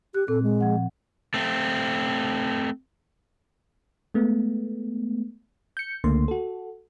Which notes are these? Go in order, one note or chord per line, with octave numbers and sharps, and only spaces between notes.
G4 F#6
A#2 C4 A4
G#3
F3 F#5
A3 C4
G#3 A3 B3
G6 C#7
C#2 D3 A3 A#3 C6
F#4 A4